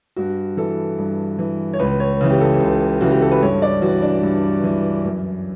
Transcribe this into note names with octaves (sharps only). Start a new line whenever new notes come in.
G2 F#4
E3 A4
G2
E3
C#5
C#2 B4
C#5
C#3 E3
G4
A4
C#2
C#3 E3 F#4
G4
A4
B4
G2 C#5
D5
E3 F#4
D4
G2
E3
F#2